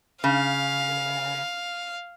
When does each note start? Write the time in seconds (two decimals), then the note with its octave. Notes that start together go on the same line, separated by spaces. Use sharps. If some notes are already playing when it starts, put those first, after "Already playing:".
0.24 C#3 F5